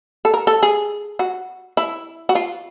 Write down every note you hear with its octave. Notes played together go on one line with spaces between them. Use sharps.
A4
A#4
A4
G#4
F#4
E4
F#4
F4